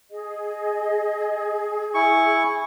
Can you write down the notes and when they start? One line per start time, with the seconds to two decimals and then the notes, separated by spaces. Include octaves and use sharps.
0.11 G#4 D#5
1.94 E4 G#5 C#6